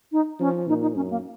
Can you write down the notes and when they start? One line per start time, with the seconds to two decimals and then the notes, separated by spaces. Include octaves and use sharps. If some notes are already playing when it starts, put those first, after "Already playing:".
0.12 D#4
0.40 F3 C#4
0.68 A#2 D#4
0.82 D#4
0.96 F#2 C#4
1.10 A#3